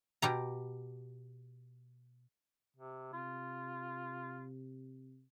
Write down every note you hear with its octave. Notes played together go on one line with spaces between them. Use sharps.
B2 G4 A#5
C3
C3 F4